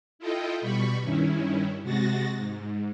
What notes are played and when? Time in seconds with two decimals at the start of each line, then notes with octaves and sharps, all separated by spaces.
0.19 E4 F4 A4 D#5 G5
0.61 B2 G3 B5 C#6
1.02 G2 D#3 C#4 E4
1.82 C3 G#3 F#4 A6 A#6
2.38 G#2